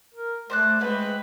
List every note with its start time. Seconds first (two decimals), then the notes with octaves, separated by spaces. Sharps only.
0.14 A#4
0.50 A3 C5 D5 F#6
0.81 G#3 A#3 C4 B4